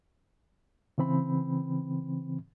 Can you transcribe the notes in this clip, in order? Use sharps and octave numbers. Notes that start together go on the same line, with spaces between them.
C#3 E3 C4 B5